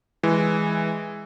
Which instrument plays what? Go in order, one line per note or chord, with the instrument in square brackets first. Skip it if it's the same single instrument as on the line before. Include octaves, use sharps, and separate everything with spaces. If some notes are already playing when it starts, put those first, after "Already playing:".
[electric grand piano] E3 G#3